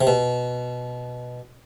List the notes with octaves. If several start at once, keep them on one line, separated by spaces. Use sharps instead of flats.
C3
B2